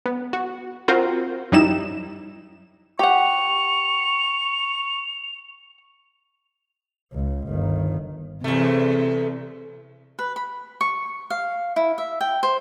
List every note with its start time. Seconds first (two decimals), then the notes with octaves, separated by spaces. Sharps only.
0.06 B3
0.33 F#4
0.88 C4 F4 F#4 A#4 C5
1.52 F#2 G3 D#4 E4 E7
2.99 G4 F#5 C#6 F7
7.13 C#2
7.49 G1 D#3
8.44 E2 C3 A3
10.19 B4
10.36 B5
10.81 C#6
11.30 F5
11.76 E4
11.98 E5
12.21 G5
12.43 C5